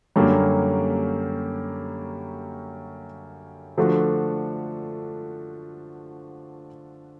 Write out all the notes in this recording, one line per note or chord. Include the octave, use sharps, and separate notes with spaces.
F#2 D3 G3 A#3 C#4
D3 F3 A3 D4 F#4